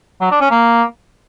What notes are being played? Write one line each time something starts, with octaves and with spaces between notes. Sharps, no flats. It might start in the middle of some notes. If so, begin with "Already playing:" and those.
F#3
D4
C#4
A#3